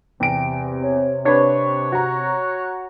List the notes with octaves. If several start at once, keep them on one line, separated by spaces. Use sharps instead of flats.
E2 C3 G5 D7
C#5
D4 B4 C#5 C#6
F#4 A#5 F#6